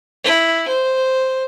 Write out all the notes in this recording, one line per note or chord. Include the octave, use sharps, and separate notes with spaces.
E4
C5